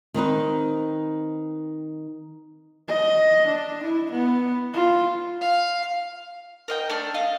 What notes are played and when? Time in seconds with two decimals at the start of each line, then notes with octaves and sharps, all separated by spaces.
0.14 D#3 C4 D#4 B4
2.88 D#5
3.47 D4
3.83 E4
4.11 B3
4.74 F4
5.41 F5
6.68 A#4 D#5 G5
6.90 A3 D4 A4 F6
7.14 D#5 F5